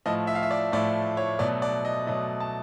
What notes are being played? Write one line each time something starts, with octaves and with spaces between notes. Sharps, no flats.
A2 F3 A3 D#5
E5
F5
E5
D5
A2 F3 A3 D5
C#5
B2 F#3 A3 D5
D5
D#5
B2 F#3 A3 D#5
A5